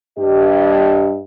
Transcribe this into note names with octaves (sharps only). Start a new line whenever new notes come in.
G2 G4 D#5